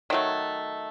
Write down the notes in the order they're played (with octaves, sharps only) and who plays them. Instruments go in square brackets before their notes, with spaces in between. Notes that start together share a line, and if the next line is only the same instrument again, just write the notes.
[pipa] D#3 F#3 A3